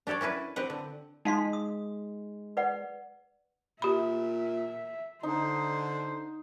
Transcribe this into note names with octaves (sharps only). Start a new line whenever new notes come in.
D4 G4 A4 C#5 D5
C#4 E4 F#4 B4
C4 G4 B4 F#5
D3
G#3 D#4 F5 C6
D#6
B4 D5 F#5
A#2 G4 E5 B5
D3 D#4 C5